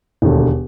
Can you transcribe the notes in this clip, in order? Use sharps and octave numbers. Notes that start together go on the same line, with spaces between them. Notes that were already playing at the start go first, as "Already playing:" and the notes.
E1 D#2 D3